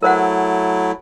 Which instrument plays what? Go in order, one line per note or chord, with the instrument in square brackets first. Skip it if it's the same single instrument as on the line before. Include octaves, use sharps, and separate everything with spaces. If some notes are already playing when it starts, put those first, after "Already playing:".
[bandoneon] F#3 A3 E4 [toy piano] A#4 C5 F#5